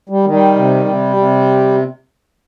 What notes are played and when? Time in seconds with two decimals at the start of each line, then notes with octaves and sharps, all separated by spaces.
0.09 G3
0.24 D#3
0.31 G3
0.55 C3
0.85 C3
1.17 C3